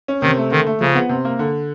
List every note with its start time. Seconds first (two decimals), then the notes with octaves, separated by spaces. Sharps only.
0.08 C#4
0.22 C3 D#3
0.37 A3
0.51 D3 D#3
0.66 A3
0.81 C#3 F3
0.95 B3
1.09 C3
1.25 A#3
1.39 D3